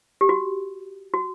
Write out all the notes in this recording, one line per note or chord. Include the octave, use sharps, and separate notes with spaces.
G4
F#4
F#4